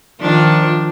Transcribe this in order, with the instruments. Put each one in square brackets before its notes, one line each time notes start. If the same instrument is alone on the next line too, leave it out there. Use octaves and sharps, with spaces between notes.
[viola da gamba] D#3 F3 D4